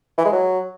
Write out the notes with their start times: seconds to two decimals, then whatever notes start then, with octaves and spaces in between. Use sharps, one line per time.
0.18 E3
0.25 G#3
0.32 F#3